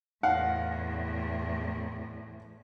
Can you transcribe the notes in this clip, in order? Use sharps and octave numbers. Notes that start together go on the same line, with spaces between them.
E2 A2 F5 F#5